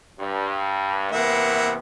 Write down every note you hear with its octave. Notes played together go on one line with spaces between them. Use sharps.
G2
C3 E3 A#3 B3 E5 F#5